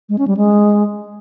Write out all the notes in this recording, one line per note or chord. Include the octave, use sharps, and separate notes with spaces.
G#3
C#4
G3
G#3